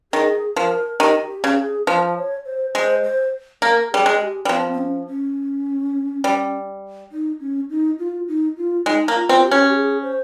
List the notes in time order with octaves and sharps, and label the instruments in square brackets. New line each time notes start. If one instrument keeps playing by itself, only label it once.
[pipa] D#3 [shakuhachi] G#4
[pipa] F3 [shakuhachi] A#4
[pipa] D#3 [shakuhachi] G4
[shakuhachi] G4
[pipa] C#3
[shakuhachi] G#4
[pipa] F3 [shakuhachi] C5
[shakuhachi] C#5
C5
[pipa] G#3 [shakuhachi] C5
[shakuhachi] C5
[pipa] A#3 [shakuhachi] A#4
[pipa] G3 [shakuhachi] G#4
[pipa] G#3
[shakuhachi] G4
[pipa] G3
[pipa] F3 [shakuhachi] C4
[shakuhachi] C4
C#4
C#4
[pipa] G3
[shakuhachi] D#4
C#4
D#4
F4
D#4
F4
[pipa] G#3 [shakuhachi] D#4
[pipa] A#3
[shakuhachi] F4
[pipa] C4
[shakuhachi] F4
G4
[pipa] C#4
[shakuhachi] G4
G#4
C5